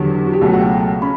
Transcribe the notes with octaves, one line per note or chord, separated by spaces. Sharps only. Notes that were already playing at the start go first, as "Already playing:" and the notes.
Already playing: E2 D3 F#3 G4
F#4
G4
C#2 B2 F#3 A3 A4
F#5
G5
C#4 B5